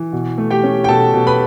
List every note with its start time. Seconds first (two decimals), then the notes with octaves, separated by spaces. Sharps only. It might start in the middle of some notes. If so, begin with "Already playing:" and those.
Already playing: E3
0.13 B2
0.38 A3
0.51 G4 G5
0.64 C#4
0.84 G5
0.88 B2 A4 A5
1.14 B2
1.27 B4 B5